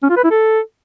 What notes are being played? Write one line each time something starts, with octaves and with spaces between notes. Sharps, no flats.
C#4
F4
B4
E4
A4